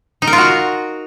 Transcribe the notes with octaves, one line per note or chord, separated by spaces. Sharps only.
D#4
A#4
F4
F#4